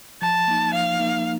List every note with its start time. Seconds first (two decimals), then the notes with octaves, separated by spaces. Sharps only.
0.22 F3 A5
0.48 A#3 D#4
0.73 F3 F5
0.99 A#3 D#4